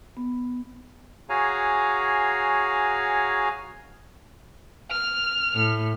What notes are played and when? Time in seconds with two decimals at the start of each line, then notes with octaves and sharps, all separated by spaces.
0.17 B3
1.29 F#4 G#4 C#5 F5 G#5 A#5
4.91 F6
5.54 A2